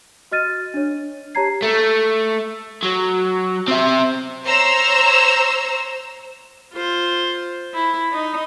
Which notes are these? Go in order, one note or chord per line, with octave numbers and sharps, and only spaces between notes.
F#4 D#5 F6 A6 D#7
D4 C#5
G4 C#5 A5 A#5 G#6 C7
A3
F#3
C4 E5
C5 C#5 A#5 E6
F4 C5
E4
D#4